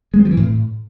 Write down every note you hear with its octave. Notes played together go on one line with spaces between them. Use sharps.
G#3
C4
F3
E3
A2